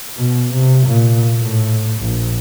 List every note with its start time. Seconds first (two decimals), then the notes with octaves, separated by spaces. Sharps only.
0.18 B2
0.54 C3
0.87 A#2
1.40 A2
2.01 A#1